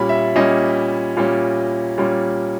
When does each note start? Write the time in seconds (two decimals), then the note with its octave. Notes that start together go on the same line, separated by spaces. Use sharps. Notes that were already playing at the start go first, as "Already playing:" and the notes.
Already playing: A#2 G3 C#4 B5
0.09 E5
0.35 A#2 G3 C#4 D#5
1.17 A#2 G3 C#4
1.98 A#2 G3 C#4